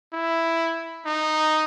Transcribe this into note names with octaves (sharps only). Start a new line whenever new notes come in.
E4
D#4